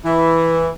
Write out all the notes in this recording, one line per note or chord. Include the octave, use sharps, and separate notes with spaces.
E3